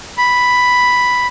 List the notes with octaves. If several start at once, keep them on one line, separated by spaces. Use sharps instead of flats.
B5